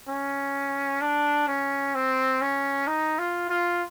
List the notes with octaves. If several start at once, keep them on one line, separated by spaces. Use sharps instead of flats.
C#4
D4
C#4
C4
C#4
D#4
F4
F4